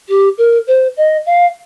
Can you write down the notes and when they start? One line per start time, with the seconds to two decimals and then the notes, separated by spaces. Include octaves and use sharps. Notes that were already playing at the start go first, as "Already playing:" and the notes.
0.08 G4
0.38 A#4
0.67 C5
0.97 D#5
1.26 F5